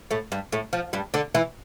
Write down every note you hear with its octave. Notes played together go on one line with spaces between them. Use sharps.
A2 A3
G2 G3
A2 A3
F3
G2 G3
D3 D4
E3 E4